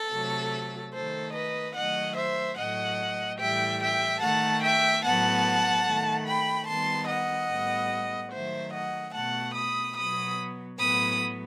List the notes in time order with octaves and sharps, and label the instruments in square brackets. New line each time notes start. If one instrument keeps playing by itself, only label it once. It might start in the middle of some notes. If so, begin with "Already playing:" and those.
Already playing: [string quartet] A4
C3 F#3 A3
D#3 A3 A4 C5
B4 D#5
D#3 F#3 A3 D#5 F#5
C5 E5
A2 F#3 A3 D#5 F#5
A2 E3 G3 E5 G5
E5 G5
D#3 A3 F#5 A5
E5 G5
A2 F#3 B3 F#5 A5
D#3 A3
G5 B5
D#3 G3 B3 A5 C6
D#5 F#5
A2 G3 B3
D#3 F#3 A3 C5 E5
D#5 F#5
B2 A3 F#5 A5
B5 D#6
B2 F#3 B3 B5 D#6
A2 F#3 B3 B5 D#6